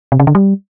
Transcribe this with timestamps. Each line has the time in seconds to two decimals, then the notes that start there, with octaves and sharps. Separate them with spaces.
0.12 C3
0.20 C#3
0.27 D3
0.35 G3